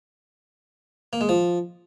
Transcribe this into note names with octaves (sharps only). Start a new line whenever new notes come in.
A#3
G#3
F3